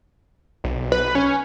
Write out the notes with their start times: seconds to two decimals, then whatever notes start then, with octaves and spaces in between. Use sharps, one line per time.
0.64 B1
0.92 B4
1.15 C#4